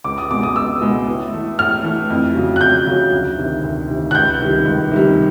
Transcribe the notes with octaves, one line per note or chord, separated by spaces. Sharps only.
C#2 D6
D#6
B2 G#3 B3 D6
D#6
C#2 E6
B2 G#3 B3
A2
E3 A3
A2 F6
E3 A3
F2
C#3 F#3
F#6
F2 G6
C#3 F#3
D2
C3 D#3
D2
C3 D#3
F#6
C#2 G6
C3 D#3 G3
C#2
C3 D#3 G3